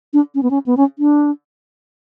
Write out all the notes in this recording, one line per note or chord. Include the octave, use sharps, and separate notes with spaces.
D4
C#4
B3
C#4
B3
C#4
D4